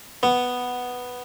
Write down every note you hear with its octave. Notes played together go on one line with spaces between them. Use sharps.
B3